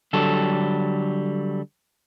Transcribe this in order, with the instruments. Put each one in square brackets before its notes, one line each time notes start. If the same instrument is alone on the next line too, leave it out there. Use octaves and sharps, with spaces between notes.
[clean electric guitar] D3 F#3 G3 A4